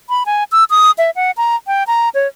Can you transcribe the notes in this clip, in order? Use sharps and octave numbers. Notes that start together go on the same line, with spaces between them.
B5
G#5
E6
D#6
E5
F#5
A#5
G5
A#5
C#5